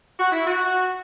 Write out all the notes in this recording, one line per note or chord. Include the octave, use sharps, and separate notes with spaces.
F#4
E4
F#4